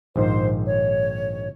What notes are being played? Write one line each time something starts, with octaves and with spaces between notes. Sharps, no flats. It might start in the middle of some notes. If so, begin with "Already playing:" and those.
A#1 G#2 D#3 C5
C#5